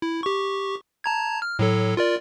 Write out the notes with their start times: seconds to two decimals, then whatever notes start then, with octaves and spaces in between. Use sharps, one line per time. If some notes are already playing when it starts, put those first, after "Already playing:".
0.02 E4
0.23 G4 C#6
1.04 A5 A#5 G#6
1.42 F6
1.59 A2 F#3 A4
1.97 F4 A#4 D5